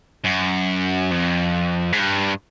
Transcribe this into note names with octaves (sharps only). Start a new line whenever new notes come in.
F#2
F2
G#2
G2